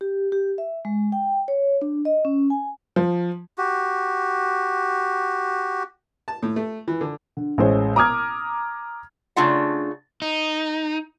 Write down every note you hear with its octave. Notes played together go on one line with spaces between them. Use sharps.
G4
G4
E5
G#3
G5
C#5
D4
D#5
C#4
G#5
F3
F#4 G4
A5
A2
A3
E3
D3
D3
A1 G#3 C5 C#5
A#5 D6 D#6 F6 G#6
C#3 A3 D4 F4 F#5
D#4